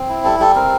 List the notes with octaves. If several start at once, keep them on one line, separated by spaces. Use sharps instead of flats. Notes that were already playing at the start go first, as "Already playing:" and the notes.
Already playing: C4
E4
G3 A4
G3 A4
C4 A#4